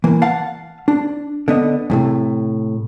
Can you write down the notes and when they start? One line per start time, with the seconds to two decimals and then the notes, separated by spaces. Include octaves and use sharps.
0.04 E3 A#3
0.22 F5 F#5 A5
0.88 D4
1.48 D3 B3 D#5
1.90 E2 A2 C3